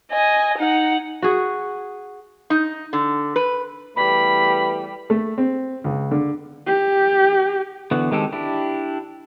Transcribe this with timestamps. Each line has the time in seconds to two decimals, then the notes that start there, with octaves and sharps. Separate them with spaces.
0.11 D#5 G#5
0.58 D#4 F#5
1.22 F#4 G#4
2.50 D#4
2.93 D3
3.36 B4
3.96 E2 G3 A3 B4 B5
5.10 A3
5.38 C4
5.84 C#2
6.11 D3
6.66 G4
7.91 D3 E3 B3 F#4
8.11 D#3 G#3 C4 G4 A4
8.32 D4 E4 G4